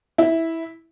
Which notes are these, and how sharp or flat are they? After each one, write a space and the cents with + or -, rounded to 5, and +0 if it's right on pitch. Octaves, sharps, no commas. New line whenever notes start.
E4 -10